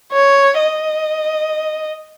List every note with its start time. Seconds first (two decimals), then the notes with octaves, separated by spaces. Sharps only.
0.12 C#5
0.59 D#5